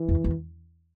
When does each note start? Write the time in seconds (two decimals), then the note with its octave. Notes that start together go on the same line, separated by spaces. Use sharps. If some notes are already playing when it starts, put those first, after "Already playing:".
Already playing: E3
0.09 E2
0.24 E2